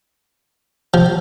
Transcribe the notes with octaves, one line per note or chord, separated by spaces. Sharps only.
F3